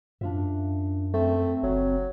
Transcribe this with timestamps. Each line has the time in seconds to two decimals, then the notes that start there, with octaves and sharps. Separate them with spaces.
0.21 F#2 D4 F4 E5
1.14 A3 C4
1.63 F#1 F#3